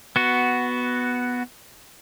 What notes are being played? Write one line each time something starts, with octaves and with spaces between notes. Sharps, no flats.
B3 F#4